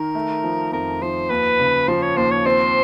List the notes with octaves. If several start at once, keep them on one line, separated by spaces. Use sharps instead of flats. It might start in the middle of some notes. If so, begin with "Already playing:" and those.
Already playing: D#3 A#4
A3
F3
F2 A#4
F3 C5
D#2 B4
C#3
F3 C5
C#5
D#2 C5
C#5
C4 C5